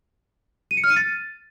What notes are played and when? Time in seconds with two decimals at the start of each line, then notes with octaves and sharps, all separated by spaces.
0.71 D#7
0.77 C#7
0.84 F6
0.90 D#7
0.96 A6